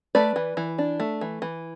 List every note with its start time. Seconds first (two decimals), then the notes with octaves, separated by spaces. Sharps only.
0.15 A3 B4 D5
0.36 E3
0.57 E3
0.78 D4
1.00 A3
1.21 E3
1.42 E3